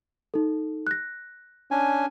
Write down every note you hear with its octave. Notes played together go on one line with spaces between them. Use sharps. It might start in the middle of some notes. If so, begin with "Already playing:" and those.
D#4 A4
F#6 A#6
C#4 D4 G#5